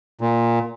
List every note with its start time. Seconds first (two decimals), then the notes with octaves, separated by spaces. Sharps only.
0.21 A#2